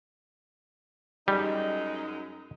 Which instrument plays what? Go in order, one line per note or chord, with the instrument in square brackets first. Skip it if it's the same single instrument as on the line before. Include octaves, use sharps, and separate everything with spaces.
[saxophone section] F#2 G#3 D#4 [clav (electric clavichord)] G3